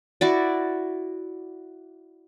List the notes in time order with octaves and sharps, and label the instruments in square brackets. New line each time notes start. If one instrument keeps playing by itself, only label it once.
[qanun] E4 F#4 D5